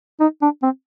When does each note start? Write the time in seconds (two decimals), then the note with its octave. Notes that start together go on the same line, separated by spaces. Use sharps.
0.20 D#4
0.42 D4
0.63 C4